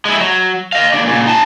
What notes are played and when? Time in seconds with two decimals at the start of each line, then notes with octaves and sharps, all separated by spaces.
0.05 G#3 E4
0.21 F#3
0.73 D#5 F5
0.93 D#2 D4
1.06 A#2 C#3
1.26 D#4 A5